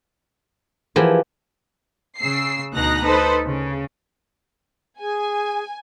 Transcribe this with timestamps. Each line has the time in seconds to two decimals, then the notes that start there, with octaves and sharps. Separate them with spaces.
0.96 E3 F3 G4 G#4 A#4
2.19 C#3 E6 C7
2.74 D2 B2 D#4 A#5 F#6 A#6
3.04 D#4 A4 B4 C5
3.45 C#3
5.00 G#4 G#5